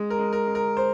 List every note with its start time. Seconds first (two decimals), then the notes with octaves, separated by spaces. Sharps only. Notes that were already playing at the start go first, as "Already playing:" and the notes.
Already playing: G#3
0.10 A#4
0.19 G#3
0.33 A#4
0.47 G#3
0.55 A#4
0.77 C5